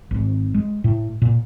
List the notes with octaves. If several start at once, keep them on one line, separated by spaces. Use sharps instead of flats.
G#1
G#3
A2
A#2